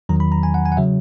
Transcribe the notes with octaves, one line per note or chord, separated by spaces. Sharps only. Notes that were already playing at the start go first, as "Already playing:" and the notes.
E2 D#3 F#3 A#5
B5
A#5
G#5
F#5
G#5
F#5
C#3 F#3 E5